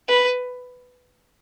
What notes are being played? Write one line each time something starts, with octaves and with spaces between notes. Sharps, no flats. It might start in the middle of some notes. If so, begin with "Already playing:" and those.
B4